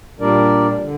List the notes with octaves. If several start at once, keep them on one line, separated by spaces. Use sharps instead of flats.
A#2 G3 D4 A#4 D5
D3